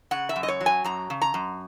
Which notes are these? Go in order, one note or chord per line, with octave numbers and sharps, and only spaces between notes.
C#3 F#5
E5
F#2
D#5
C#5
F#3
G#5
F#2 A#5
C#3
A#5
F#2